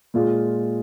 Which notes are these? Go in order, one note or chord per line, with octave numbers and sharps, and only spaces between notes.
A#2 G#3 F4 G#4